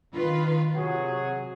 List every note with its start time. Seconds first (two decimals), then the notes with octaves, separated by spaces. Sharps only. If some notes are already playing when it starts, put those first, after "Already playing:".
0.14 D#3 F4 B4
0.76 C3 F#3 F#4 G#4